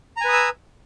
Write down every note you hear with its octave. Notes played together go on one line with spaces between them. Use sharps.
B4 G#5 A#5 D#6 E6